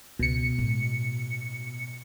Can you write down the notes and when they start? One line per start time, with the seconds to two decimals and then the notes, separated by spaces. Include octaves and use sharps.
0.19 C#2 B2 C#7
0.58 A2 G#3